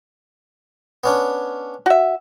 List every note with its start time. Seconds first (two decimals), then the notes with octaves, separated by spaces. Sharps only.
1.04 B3 C#4 D4
1.86 F#4 E5